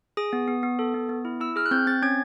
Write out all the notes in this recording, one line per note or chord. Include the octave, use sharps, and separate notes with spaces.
G#4 D#6
B3
B3
B3
A4
B3
B3
E4
E4 E6
G#4 F6
F#6
C4 G6
C4 A6
C#4 G#6